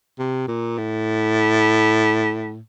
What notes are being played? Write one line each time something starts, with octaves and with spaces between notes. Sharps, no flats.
C3
A#2
A2